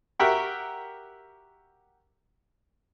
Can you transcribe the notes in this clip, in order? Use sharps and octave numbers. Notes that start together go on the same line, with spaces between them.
F#4 G4 A#4 E5 F#5 G5